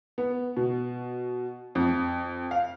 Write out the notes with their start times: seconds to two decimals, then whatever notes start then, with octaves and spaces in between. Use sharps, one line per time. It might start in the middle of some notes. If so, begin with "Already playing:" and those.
0.18 B3
0.57 B2
1.75 F2
2.51 F5